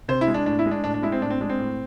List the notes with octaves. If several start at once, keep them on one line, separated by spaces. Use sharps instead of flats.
C3 C5
E4
G#3
D4
A2 D4
E4
G#3
D4
A2 D4
D4
G#3 E4
C4
A2 D4
C4
G#3 D4
C4
A2